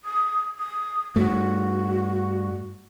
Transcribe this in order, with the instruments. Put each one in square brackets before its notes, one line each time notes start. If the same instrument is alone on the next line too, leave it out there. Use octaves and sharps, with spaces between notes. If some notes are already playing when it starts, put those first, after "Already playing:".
[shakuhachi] D#6
D#6
[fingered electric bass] G2 A3 [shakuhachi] F#4